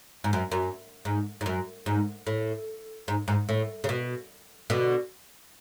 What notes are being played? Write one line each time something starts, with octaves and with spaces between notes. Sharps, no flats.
G#2
F#2
F#2
G#2
G#2
F#2
G#2
A2
G#2
G#2
A2
C#3
B2
B2 D3